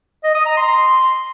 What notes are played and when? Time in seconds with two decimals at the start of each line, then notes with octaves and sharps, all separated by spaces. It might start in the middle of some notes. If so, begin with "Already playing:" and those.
0.24 D#5
0.35 D#6
0.46 A#5
0.57 C6
0.68 C6